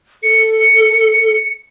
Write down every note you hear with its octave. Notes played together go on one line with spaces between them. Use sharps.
A4 C#7